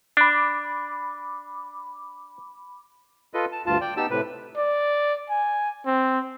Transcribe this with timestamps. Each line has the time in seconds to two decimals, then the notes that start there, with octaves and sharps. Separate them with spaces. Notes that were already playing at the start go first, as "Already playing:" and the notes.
0.17 D4 B5 D6
3.34 F4 A4 B4 D#5
3.52 A5
3.66 D2 G2 F4 A5
3.81 D5 G5
3.97 B3 D#4 G4 A5 E6
4.10 A2 C3 B4
4.57 D5
5.30 G#5
5.86 C4